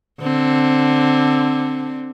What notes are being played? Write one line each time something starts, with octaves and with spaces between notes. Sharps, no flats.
D3 C4